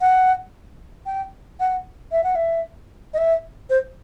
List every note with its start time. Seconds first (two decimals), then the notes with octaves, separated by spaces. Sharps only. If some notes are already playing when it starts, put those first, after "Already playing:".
0.01 F#5
1.06 G5
1.60 F#5
2.12 E5
2.24 F#5
2.35 E5
3.14 D#5
3.18 E5
3.70 C5